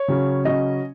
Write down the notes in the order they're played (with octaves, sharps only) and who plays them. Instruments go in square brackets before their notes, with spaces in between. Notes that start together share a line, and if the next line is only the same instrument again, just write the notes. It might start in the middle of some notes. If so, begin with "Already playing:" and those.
Already playing: [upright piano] C#5
C#3 F#3 C#4
C#3 F#3 C#4 D#5